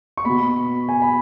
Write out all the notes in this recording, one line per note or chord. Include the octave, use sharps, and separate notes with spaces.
C#6
B2 B3 B5
G#5
B5